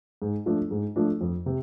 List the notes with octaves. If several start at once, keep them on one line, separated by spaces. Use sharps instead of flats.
G#2
F3 A3 D4
G#2
F3 A3 D4
F2
C3